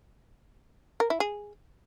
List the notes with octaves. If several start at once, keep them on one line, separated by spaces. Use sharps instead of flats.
A#4
E4
G#4